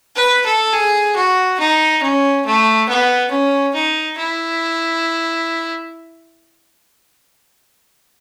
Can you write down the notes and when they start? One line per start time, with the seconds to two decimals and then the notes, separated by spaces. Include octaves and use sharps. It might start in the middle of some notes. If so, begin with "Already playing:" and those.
0.15 B4
0.45 A4
0.73 G#4
1.16 F#4
1.59 D#4
2.02 C#4
2.45 A3
2.88 B3
3.31 C#4
3.74 D#4
4.17 E4